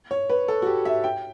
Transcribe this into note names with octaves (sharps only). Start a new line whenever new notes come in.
C#5
B4
A4
F#4
G4
E5
G5